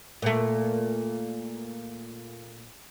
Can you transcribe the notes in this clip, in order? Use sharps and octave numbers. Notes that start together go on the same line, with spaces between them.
A#2 A3